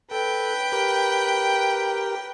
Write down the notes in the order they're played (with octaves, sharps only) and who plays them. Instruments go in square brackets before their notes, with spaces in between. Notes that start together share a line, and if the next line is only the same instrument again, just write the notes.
[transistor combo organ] A4 [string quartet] B4 G5
[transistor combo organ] G4 A#4